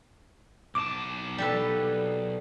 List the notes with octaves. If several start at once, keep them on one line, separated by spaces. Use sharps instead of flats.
B1 A5 D6
G3 A4 B4